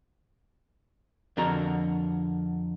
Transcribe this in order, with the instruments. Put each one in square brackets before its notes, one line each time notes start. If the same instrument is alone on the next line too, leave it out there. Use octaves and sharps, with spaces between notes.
[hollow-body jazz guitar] F2 D3 F#4 A#4 A#5